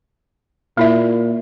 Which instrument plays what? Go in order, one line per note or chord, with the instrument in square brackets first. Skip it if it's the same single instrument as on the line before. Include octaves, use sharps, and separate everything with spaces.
[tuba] A#2 [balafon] A#3 E4 E5